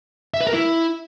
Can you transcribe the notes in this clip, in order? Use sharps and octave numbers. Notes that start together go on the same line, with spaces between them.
E5
B4
A#4
E4